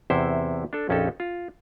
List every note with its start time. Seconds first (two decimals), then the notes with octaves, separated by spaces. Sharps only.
0.10 E2 C3 E4 C5
0.73 D4 A4
0.89 A#1 F2 C#4 D#4 G4 A4
1.20 F4